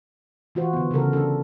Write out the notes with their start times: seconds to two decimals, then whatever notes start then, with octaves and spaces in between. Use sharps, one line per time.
0.55 E3 F4 F#4 C5
0.73 D3 B3
0.91 C#3 G3 A4 A#4
1.13 D4 A4